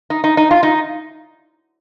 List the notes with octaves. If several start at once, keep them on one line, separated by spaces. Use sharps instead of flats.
D#4
D#4
D#4
F4
D#4